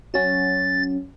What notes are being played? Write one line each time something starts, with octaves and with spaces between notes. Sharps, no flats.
F#3 C#4 F#4 A6